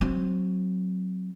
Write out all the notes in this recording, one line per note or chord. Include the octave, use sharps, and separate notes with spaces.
F#3 C4